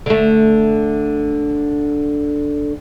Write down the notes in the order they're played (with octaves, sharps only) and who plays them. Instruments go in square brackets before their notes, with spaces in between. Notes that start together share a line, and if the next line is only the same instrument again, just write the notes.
[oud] D3 A3